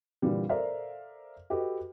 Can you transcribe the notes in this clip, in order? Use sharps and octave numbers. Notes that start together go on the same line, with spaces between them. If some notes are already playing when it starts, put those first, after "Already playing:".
A#2 D3 E3 G3
A4 A#4 C5 D5 E5 F5
F#4 G4 A4 B4 D#5